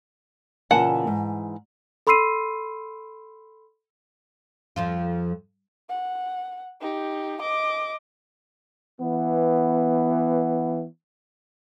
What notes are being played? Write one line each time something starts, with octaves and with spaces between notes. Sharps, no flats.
A#2 C#3 E3 A#3 F#5 A5
G#2
A4 B5 C6 E6 C7 D#7
F2 F3 F4
F#5
D#4 G4
D#5 D6
E3 B3